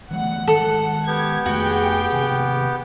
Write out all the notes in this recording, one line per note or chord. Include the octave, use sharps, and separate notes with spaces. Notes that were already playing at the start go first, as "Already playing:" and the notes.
E3 G3 A3 F#5
D#3 G#3 A4
B3 G4 G#6
F2 A3 F#4 G#4 G5
C3 D#3 A#3